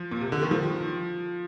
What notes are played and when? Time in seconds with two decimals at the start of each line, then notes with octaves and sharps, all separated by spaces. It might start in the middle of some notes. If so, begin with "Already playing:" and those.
Already playing: F3
0.11 A#2
0.21 C3
0.32 D3
0.42 D#3
0.51 F3